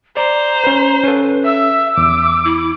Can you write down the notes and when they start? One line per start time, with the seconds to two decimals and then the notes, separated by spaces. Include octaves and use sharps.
0.17 C5 D5 A#5
0.64 C#4 B4
1.04 C#4 A4 B4
1.45 E5 E6
1.97 E2 D6
2.45 E4